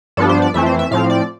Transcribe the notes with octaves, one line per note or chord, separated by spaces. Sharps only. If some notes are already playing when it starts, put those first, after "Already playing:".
G2 F3 B3 D4 A4
C5
D5
F2 E3 A3 C4 E5
C5
E5
A2 F3 C4 F5
D5